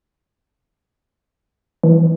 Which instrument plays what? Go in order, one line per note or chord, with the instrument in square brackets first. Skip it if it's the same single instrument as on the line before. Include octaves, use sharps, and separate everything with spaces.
[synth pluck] E3